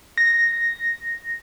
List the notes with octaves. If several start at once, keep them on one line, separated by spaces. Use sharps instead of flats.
A#6